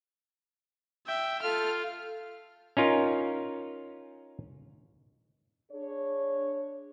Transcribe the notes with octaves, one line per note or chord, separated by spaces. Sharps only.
E5 G5
F4 A4 F6
C#4 D#4 F4 A#4
D4 G#4 C#5